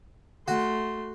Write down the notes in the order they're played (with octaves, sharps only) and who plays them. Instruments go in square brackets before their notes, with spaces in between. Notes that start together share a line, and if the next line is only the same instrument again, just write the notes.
[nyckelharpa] A3 C6 [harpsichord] F#4